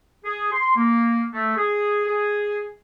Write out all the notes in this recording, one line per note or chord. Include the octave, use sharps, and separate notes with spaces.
G#4
C6
A#3
A3
G#4
G#4